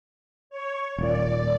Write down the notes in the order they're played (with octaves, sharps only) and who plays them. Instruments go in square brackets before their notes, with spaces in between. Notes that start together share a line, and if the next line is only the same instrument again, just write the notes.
[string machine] C#5
[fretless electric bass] D#1 A#2 [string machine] D5